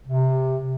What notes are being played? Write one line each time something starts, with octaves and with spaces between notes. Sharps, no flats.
C3